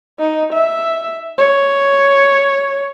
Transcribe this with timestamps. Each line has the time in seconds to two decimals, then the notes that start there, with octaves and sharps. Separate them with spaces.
0.19 D#4
0.53 E5
1.38 C#5